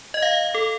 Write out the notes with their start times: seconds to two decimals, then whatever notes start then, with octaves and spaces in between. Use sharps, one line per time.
0.14 D#5
0.22 F5
0.54 A4